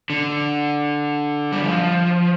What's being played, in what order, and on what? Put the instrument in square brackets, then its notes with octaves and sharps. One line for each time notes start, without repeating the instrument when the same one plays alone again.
[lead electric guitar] D3
G3
F3